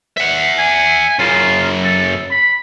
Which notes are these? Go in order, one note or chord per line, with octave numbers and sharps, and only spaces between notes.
E5 F#5
G#5
F#2 C#3 F4
A4
B5